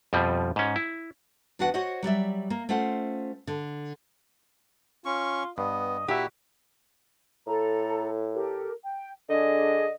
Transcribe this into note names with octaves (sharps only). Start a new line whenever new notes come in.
F2 B2 F3 G3
G#2 C#4
E4
E2 D4 F#4 B4 F#5
F#4 C5 C#5 D#5 F#5
F#3 G3 D5 E5
A#3
A3 C#4 F4 C5 F#5
D3
C#4 F4 C#6
G2 B3 D#5
A#2 E4 F#4 G4 E5
A2 A4 A#5
G4 A4 A#4
G5
D3 D4 G#4 D#5